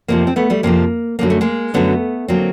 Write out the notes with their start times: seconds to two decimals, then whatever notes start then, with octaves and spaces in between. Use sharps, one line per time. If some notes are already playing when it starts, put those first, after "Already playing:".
0.08 F2 C3 F3 A#3 C4
0.27 C4
0.36 A3 B3
0.50 G3 A3
0.63 F2 C3 F3 G#3 A#3
1.19 F#2 D3 F#3 A#3
1.30 A3
1.41 G#3 A#3
1.74 F#2 D3 F#3 A3 B3
2.28 D3 F#3 A#3 C4